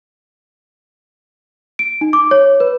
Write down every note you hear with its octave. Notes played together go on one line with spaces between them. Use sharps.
D7
D#4
D6
C#5
B4